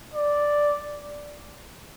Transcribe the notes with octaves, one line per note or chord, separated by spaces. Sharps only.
D5